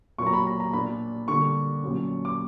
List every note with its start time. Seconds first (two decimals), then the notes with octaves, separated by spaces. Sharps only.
0.18 A#2 F#3 A#3 C#6
0.27 A#5
0.33 B5
0.47 A#5
0.60 A#5
0.73 A#2 A#3 D4 B5
1.28 D3 G3 A#3 C#6
1.83 A#2 F#3 C#4
2.25 D6